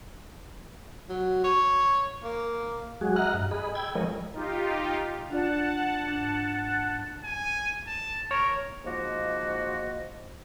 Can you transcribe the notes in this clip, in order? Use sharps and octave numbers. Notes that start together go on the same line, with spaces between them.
F#3
C#5
A#3
F#3 G#3 F#4 G#4
D#5 E5 F#5 A#5 F6 F#6
G2
G#4 D#5 B5
G5 B5 E6 G#6
F3 G#3 A#4 C#5 D#5
D#4 F4 G4
D4 F4 D5 F#5 A5
G#2 D4
G#5
A5
A#4 C#5
G#2 F3 A#3 F#4 D#5